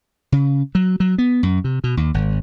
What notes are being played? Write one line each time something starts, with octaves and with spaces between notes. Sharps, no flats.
C#3
F#3
F#3
B3
F#2
C3
B2
D#2
G#1